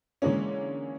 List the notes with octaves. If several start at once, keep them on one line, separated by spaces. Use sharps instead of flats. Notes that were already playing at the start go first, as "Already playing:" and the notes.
D3 E3 G#3 A#3 C#4